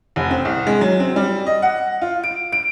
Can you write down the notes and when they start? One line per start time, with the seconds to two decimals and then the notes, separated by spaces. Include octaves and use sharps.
0.16 F1
0.31 C4
0.45 C2
0.67 G#3
0.81 F#3
1.00 C4
1.16 G3
1.46 D#5
1.62 F#5
2.02 F4
2.24 D7
2.52 D7